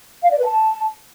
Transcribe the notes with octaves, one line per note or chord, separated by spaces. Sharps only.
F5
D5
B4
A5